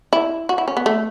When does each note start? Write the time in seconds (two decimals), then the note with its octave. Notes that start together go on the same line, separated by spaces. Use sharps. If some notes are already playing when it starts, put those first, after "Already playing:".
0.13 E4
0.49 F#4
0.58 E4
0.68 C#4
0.77 B3
0.86 A3